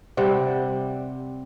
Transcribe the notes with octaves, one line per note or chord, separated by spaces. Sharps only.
C3 G3 C4 F#5